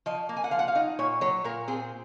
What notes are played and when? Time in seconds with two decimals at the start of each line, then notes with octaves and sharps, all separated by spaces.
0.06 F3 D#5
0.29 A#3
0.36 G#5
0.44 F#5
0.51 F3 F5
0.59 F#5
0.68 F5
0.75 D#4
0.99 A#2 C#5
1.21 F#3 C#5
1.44 A#2 A#4
1.68 C4 G#4